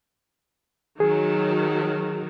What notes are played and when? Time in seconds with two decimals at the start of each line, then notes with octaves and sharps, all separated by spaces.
1.00 D#3 F#3 G#4